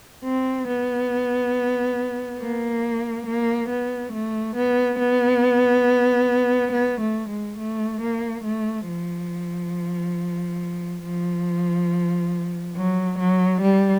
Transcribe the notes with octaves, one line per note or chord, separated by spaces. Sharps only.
C4
B3
A#3
A#3
B3
A3
B3
B3
B3
A3
G#3
A3
A#3
A3
F3
F3
F#3
F#3
G3